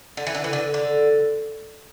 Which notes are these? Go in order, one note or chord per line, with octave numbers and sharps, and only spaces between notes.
D3
E3
D3
E3
D3
D3